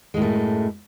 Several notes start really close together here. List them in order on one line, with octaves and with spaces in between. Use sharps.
G#3 A2 F#2 A3